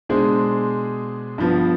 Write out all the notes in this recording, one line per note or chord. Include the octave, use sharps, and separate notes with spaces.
B2 G#3 D4 G#4 C5
G2 F3 B3